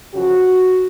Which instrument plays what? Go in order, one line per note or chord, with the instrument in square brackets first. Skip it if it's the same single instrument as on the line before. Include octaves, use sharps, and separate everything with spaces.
[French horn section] F#2 C#3 F3 F#4